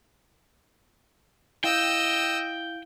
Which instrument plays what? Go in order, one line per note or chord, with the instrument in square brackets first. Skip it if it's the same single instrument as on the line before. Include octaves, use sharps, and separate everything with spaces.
[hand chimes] E4 F5 [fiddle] D#5 E6 [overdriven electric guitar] G5